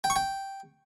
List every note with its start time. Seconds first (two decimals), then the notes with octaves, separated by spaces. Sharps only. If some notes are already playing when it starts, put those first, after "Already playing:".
0.04 G5
0.10 C#6
0.16 G5